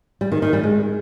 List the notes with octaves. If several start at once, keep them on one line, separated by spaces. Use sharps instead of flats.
G3
D#3
D#3
G3
G#3